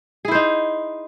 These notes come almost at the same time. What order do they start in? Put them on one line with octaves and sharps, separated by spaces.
G#4 E4 C5 D#4